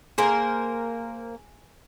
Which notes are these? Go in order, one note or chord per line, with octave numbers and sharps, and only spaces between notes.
A#3 G#4 A#4 C5